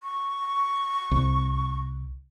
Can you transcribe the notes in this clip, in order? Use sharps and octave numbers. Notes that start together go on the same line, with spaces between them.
C#6
C2